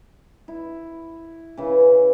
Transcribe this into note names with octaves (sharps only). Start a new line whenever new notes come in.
E4
C#3 E3